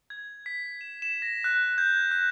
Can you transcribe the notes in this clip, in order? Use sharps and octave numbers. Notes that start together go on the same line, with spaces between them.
G#6
B6
E7
E7
A#6
F#6
G6
F#6